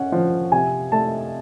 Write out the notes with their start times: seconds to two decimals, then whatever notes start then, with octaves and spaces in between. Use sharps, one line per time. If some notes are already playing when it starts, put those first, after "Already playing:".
Already playing: C#4 F#5
0.12 F3
0.52 C3 G#5
0.92 A3 A5